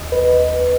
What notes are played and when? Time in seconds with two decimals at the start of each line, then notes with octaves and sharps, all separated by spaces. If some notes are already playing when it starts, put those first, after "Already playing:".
Already playing: D#2 D#5
0.12 B4